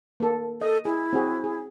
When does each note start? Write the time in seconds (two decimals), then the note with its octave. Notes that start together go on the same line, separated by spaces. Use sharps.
0.20 A#3 A4
0.61 A4 D#5
0.85 E4 G#4
1.13 C4 F#4 G#4
1.44 G#4